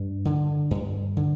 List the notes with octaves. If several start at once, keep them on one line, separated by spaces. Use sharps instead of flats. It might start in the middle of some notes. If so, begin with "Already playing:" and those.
Already playing: G2 D4
D3
G2
D3